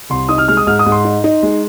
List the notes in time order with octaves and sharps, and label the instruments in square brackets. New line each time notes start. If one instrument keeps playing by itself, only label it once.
[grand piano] C2 C6
D#4 D#6
F6
G#3 F6
D#6
G#2 F6
D#6
G#2
C6
D#4
D#4
G#3